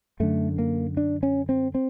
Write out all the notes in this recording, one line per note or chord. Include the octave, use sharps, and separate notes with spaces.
F#2 D3 A3
A#3
D4
C#4
C4
C4